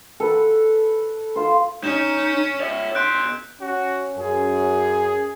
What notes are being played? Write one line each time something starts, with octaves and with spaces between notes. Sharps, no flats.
A4 B4
F4 C5
C#4 D#4 E7
C#5 E5
B2 C6 F#6 G6 D7
C#4 F#4
F#2 G#4